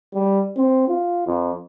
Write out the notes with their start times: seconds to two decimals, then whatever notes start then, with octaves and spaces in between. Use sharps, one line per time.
0.14 G3
0.56 C4
0.88 F4
1.27 F2